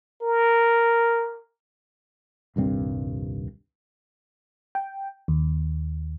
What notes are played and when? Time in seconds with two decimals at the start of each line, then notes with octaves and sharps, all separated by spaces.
0.22 A#4
2.56 D#1 C2 G2 C4
4.75 G5
5.28 D#2